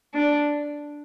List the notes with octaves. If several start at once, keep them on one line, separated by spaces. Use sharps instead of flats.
D4